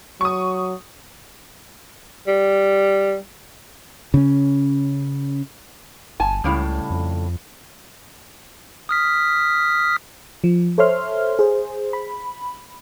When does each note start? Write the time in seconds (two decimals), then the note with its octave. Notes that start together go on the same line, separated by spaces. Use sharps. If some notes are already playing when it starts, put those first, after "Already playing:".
0.21 F#3 C#6 D#6
2.27 G3
4.14 C#3 C#4
6.20 G1 G#5 A5
6.44 C#2 A2 C#3 G3
6.90 F2
8.89 D#6 F6 B6
10.44 F3
10.78 A4 C5 C#5 E5 C6 F6
11.39 G#4 C5
11.93 B5